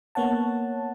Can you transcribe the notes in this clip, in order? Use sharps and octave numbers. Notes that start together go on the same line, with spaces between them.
A#3 B3 C#5 F#5 A5